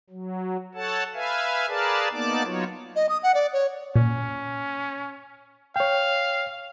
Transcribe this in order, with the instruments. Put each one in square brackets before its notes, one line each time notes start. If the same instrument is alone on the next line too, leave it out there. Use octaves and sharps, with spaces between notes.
[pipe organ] F#3
A4 C#5 F#5 A5
B4 E5 F5 G#5
G#4 A#4 B4 D5 F5 A5
A#3 B3 D#4 D5 A5 D6
F#3 B3 D#4 F4 C#5
[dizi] D#5
D#6
F#5
D5
C#5
[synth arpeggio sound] A#2 [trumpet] C#4
[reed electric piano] C#5 G5 [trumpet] F5